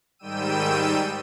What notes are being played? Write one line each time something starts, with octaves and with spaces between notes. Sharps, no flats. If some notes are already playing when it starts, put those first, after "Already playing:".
G#2 D#3 G3 G5 E6 D#7